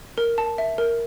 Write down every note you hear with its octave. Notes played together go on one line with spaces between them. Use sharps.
A#4
A5
E5
A#4